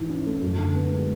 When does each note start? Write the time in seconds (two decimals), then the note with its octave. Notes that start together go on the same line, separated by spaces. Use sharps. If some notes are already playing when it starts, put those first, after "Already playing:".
Already playing: G#2 E3
0.09 C#4
0.26 A3
0.42 F#2
0.58 D3
0.75 B3
0.91 G#3